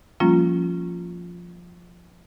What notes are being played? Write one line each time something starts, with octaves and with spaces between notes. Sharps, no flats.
F3 G3 A#3 C#4 F4